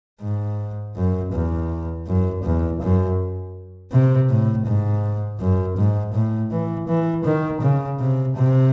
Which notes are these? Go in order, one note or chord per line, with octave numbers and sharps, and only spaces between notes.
G#2
F#2
E2
F#2
E2
F#2
C3
A2
G#2
F#2
G#2
A2
E3
E3
D#3
C#3
C3
C3